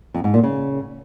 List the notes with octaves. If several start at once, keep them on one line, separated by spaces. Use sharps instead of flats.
F2
G#2
A#2
C#3